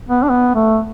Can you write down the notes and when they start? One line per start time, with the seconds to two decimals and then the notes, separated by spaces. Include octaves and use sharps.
0.09 B3
0.23 D4
0.29 B3
0.55 A3